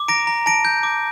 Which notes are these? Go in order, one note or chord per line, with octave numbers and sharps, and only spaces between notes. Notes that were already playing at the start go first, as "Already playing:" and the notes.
Already playing: D6
A#5 A#6 D7
A#5
A5 A#6 D7
G6
D6